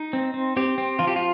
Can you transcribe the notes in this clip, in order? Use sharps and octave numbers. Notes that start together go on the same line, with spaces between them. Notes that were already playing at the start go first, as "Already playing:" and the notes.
Already playing: D#4
C4
C4
C4 G4
C4
F3 F4
G4
F4